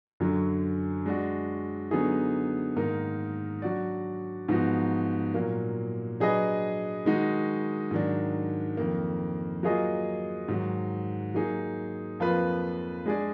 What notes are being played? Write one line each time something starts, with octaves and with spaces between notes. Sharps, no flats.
F#2 D3 F#3
G#3 D4 F#4
D3 F#3 B3 D#4 G#4
G#2 D#3 A#3 D#4 A#4
F#3 D4 F#4 D5
G#2 F3 B3 D#4 F#4
A#2 F#3 A#3
F#3 D4 G#4 B4 D#5
D#3 G#3 D#4 F#4
G#2 D#3 F#3 D4
F2 D#3 A#3
F#3 A#3 F4 G#4 D#5
G#2 D#3 F#3
F#3 A#3 D#4 G#4
F2 F3 A#3 F4 B4
G#3 D4 G#4 D5